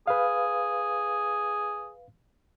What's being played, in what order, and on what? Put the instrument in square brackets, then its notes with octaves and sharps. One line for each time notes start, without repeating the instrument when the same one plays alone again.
[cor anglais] G#4 [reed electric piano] B4 F5